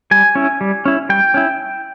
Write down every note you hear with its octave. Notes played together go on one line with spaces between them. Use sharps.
G3 G#5
C#4 E4
G3
C#4 E4
G3 G5
C#4 E4